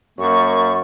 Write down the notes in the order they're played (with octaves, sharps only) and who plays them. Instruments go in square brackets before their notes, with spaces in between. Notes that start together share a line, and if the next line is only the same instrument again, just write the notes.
[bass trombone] F#2 [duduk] A#3 [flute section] C#6